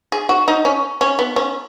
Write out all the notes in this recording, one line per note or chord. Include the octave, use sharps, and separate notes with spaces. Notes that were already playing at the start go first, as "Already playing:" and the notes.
G#4
F#4
D#4
C#4
C#4
B3
C#4